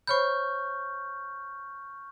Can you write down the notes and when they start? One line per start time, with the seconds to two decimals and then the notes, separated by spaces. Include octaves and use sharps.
0.07 C5 C#5 B5 C#6 F6 G6